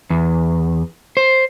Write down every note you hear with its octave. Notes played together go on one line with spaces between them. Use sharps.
E2
C5